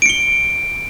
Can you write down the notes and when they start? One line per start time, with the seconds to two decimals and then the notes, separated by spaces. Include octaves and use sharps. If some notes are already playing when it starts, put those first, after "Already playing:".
0.02 D7
0.06 C#7
0.09 G7